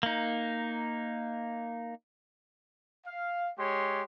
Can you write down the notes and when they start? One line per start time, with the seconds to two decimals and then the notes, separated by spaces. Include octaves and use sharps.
0.03 A#3 D#4
3.05 F5
3.58 G#3 G4 C#5 C6